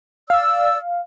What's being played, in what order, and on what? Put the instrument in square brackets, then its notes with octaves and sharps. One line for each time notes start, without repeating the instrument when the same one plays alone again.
[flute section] D5 E6 [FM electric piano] F5